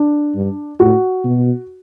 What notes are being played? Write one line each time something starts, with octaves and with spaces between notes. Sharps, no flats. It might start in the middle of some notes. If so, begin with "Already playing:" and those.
Already playing: D4
G2
A2 F#4
B2